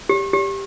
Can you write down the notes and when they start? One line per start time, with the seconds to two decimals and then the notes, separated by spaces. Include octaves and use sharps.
0.09 G4
0.33 G4